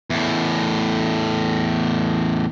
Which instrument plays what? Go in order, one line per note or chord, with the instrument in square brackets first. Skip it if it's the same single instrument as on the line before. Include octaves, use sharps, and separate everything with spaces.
[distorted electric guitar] E2 A2